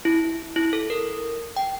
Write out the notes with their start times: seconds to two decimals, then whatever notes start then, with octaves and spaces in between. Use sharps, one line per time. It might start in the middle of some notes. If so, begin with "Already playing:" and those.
0.05 E4
0.56 E4
0.73 A4
0.90 A#4
1.56 G5